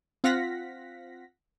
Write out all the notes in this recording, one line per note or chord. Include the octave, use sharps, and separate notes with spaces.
C4 F4 F5 F#5 A#6 B6